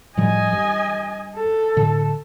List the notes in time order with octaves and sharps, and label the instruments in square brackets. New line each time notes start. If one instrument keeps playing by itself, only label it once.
[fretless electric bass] A2 F3 G3 [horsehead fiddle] D#5 G#5
[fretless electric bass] G2
[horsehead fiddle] A4
[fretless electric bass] A2 D3